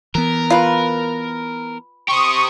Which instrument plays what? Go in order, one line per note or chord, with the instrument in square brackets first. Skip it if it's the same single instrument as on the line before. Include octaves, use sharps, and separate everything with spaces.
[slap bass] E3 B3 [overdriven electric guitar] A#4
[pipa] F4 B4
[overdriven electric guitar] G4 C5 [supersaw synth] C#6 D#6